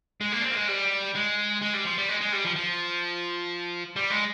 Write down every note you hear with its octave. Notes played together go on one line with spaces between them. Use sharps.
G#3
A#3
D4
C4
A#3
G#3
G3
G#3
G#3
G3
F3
G3
G#3
G#3
G3
F3
F3
G3
G#3